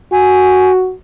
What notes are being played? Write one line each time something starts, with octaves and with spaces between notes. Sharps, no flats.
F#4 G#5